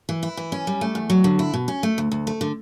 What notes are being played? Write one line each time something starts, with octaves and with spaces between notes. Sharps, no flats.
E3
E4
E3
C#4
G3
A3
E2
F#3
D3
E4
B2
C#4
A3
D2
D2
A3
D3